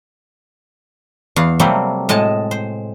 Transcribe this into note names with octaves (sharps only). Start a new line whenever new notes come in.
E2 F5 F#5
C3 F#3 G3 A3 A#3 C4
A2 G#3 D#5 A5
C5